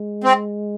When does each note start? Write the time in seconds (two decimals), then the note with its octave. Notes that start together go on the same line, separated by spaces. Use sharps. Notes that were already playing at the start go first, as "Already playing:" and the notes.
Already playing: G#3
0.24 C4